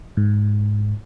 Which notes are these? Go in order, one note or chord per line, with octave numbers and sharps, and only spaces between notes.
G#2